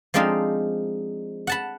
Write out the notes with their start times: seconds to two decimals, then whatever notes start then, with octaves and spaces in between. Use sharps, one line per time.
0.14 F3 G#3 C4 D4 D#4 F4
1.47 F#5 A5 B5